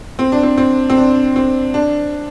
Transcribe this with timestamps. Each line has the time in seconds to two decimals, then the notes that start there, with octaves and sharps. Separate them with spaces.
0.19 C4
0.32 D4
0.43 C4
0.57 C4
0.90 C4
0.98 D4
1.36 C4
1.74 D4